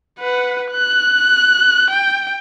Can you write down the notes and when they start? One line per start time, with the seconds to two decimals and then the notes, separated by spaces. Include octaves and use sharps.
0.19 B4 F#5
0.72 F#6
1.91 G5